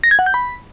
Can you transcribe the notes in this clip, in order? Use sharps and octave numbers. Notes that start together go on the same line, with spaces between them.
A#6
G#6
F#5
G6
B5